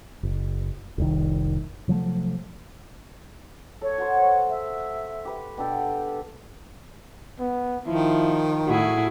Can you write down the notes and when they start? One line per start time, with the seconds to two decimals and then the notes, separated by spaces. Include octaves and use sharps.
0.23 F#1
0.98 F1 C2 D#3
1.88 C3 F3 F#3 A3
3.81 A4 C#5
3.98 F#4 C5
4.49 E5
5.25 G4 B4
5.57 B2 D4 A4 G5
7.39 B3
7.87 D#3 F3 E4
8.67 A2 E4 F#4 G#4